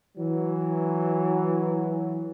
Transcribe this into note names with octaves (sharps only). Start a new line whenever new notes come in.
E3 F#3